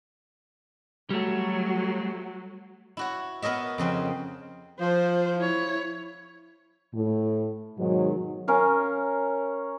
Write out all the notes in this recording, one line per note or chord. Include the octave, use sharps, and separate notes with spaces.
F#3 G3 A3
E4 F#4 C#5
B3 A#4 C#5 D#5 E5
F2 C#3 C4 G5
F3 C5
E4 C#5
A2
G#2 B2 D#3 F#3
C#4 A#4 F5